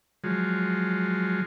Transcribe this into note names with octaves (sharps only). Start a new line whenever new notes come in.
F3 F#3 G#3